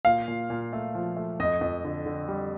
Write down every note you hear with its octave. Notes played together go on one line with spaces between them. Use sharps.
A#2 F5
A#2
A#2
A3
F3
A3
F2 D#5
F2
D3
D3
G3